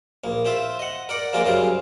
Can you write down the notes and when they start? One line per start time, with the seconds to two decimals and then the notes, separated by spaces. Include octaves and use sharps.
0.24 A#1 A#3
0.45 C4 F4 C5 E5
0.79 D#5 F#5
1.09 A#4 D5 F#5
1.33 F3 G#3 A#3 F4 A#4 D5
1.45 F#2 C#3 G3 C4 G#4 F5